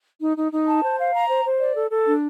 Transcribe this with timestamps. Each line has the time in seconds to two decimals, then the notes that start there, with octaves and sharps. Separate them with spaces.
0.21 D#4
0.37 D#4
0.52 D#4
0.67 A5
0.83 C5
0.99 F5
1.13 A#5
1.29 C5
1.45 C5
1.60 D5
1.75 A4
1.91 A4
2.06 D4